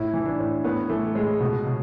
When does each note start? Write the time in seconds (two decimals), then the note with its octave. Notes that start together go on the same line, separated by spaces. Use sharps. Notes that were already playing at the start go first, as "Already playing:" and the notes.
Already playing: A2 E4
0.13 E3
0.25 D4
0.39 A2
0.64 A2 B3
0.89 E3 A3
1.15 A2 G#3
1.40 B2
1.67 B2